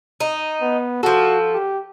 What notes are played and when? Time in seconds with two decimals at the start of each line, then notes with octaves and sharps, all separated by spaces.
0.20 D#4
0.62 B3
1.03 F3 F#4 A4
1.54 G4